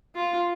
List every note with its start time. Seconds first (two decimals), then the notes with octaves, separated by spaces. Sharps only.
0.15 F4